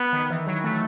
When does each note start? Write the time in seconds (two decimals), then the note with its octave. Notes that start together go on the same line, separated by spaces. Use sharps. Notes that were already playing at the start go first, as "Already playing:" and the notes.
Already playing: B3
0.13 D#3
0.30 E3
0.47 F#3
0.64 A3